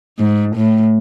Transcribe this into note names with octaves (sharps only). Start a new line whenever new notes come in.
G#2
A2